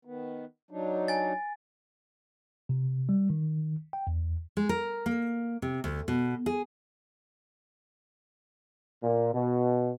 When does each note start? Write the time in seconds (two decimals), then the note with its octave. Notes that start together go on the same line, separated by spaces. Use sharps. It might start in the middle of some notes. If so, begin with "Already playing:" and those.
0.05 D#3 B3
0.71 F#3 D4 D#4
1.08 G#5 A6
2.69 C3
3.09 G3
3.30 D#3
3.93 G5
4.07 E2
4.57 G#3
4.69 A#4
5.06 A#3
5.62 C3
5.84 D2
6.08 B2
6.46 G#4
9.03 A#2
9.33 B2